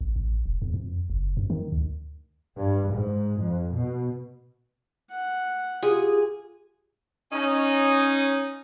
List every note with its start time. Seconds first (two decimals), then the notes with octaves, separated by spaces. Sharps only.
0.01 G#1
0.16 A1
0.46 D#1
0.62 E2
0.74 F2
1.10 F#1
1.37 F#2
1.50 D#3
1.72 D2
2.57 G2
2.94 G#2
3.42 F2
3.75 B2
5.11 F#5
5.83 F4 G4 G#4
7.33 C#4 D#4